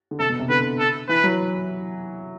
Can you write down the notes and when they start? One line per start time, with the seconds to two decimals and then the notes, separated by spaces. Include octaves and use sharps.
0.11 D3
0.19 C3 A4
0.29 B2
0.39 C3
0.50 D3 B4
0.79 A4
1.09 E3 B4
1.24 F#3